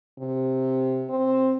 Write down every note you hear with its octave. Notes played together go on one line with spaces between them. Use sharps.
C3
C4